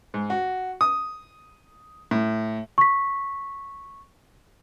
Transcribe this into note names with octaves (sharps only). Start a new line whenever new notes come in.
G#2
F#4
D#6
A2
C#6 B6